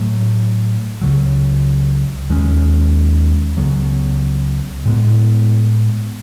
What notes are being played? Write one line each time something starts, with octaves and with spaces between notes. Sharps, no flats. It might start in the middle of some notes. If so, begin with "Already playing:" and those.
Already playing: A2 F#3 A3
C#2 C#3 F#3
D#2 D#3 G#3 C#4
C#2 C#3 F#3 B3
A2 G#3 B3